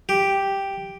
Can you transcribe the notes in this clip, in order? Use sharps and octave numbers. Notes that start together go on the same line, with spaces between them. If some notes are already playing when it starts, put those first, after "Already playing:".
G4